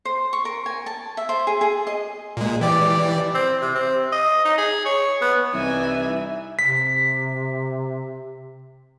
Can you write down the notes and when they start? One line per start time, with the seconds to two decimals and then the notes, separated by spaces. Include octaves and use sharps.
0.05 C5
0.33 C#6
0.45 A#4
0.66 G#5
0.86 A5
1.17 E5
1.29 C5
1.47 G#4
1.61 G#4
1.87 D#5
2.37 A#2 G#3
2.61 E3 G4 D5
3.34 C4
3.61 C3
3.75 C4
4.12 D#5
4.45 D#4
4.58 G#4
4.85 C#5
5.21 B3
5.53 C2 E3 D#4 D5 E5 G#5
6.59 C3 B6